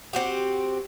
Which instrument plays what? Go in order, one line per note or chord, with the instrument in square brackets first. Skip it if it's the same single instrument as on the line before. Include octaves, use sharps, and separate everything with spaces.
[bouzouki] C4 F#4 G4